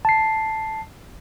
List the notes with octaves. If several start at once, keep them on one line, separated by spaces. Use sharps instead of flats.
A5 C7